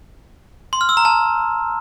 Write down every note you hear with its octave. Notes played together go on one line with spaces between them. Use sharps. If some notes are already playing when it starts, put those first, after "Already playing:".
C6
F6
E6
A#5
A5